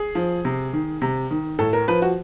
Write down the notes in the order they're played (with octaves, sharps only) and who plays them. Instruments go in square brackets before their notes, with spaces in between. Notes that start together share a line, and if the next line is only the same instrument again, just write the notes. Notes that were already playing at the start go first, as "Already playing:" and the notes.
Already playing: [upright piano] G#4
F3
C3
D#3
C3
D#3
A2 A4
A#4
F3 B4
F#4